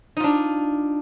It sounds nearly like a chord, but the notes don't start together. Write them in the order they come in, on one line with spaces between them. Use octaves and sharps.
D#4 F4 D4